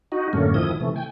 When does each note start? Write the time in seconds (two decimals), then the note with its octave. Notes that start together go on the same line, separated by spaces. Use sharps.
0.12 D#4 F#4
0.33 F#2 A2 D3 A3 A#3 C#4
0.54 D#3 F3 E4 D#6
0.80 C3 E3 A3
0.96 G5 G#5